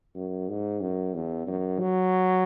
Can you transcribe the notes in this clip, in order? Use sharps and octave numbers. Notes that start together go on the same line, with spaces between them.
F#2
G#2
F#2
E2
F#2
F#3